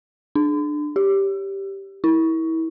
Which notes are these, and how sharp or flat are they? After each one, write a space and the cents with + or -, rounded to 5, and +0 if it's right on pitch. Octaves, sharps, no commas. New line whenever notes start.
D4 +20
G4 +0
E4 -25